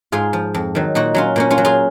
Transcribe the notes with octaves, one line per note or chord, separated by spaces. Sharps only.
G#2 F4 G#4
F3
F2
D#3 F#3
A#2 D#4 F#4
F#3 C#4 F4
A#2 A#3 C#4
C#4 F4
F#3
F4 G#4